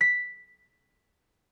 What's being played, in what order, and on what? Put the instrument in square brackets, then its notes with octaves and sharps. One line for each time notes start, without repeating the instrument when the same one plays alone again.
[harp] B6